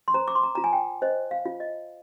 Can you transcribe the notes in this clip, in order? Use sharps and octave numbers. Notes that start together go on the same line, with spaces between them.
C6
C5 A#5
D6
C6
A#5
F4 A#5
G#5
G5
C5 D#5
F5
F4
D#5